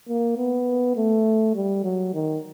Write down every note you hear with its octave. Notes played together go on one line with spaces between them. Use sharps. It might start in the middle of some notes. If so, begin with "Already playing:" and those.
A#3
B3
A3
G3
F#3
D#3